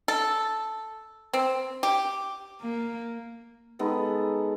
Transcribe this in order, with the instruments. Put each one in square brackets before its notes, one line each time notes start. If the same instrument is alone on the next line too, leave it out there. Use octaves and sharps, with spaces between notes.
[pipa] A4
C4
G4
[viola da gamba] A#3
[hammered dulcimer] G#3 B3 D#4 A4